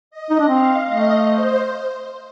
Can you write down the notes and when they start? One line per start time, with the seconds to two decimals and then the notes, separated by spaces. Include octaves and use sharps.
0.11 D#5
0.30 D#4
0.40 D4
0.49 C4 F5
0.88 A3 D#5
1.28 C5